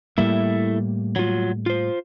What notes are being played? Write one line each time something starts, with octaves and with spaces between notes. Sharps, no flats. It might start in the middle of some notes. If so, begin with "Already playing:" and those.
A2 G3 A3 A#3 E4 E5
F#3 F4
F4 C5